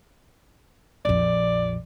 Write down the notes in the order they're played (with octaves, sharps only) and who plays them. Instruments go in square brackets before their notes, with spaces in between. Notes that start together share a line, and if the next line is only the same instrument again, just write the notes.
[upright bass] A#1 F2 [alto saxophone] D5